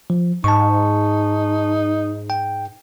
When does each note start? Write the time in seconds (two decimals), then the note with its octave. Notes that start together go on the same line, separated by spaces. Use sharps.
0.10 F3
0.44 G#2 D#4 A5 C#6
2.30 G5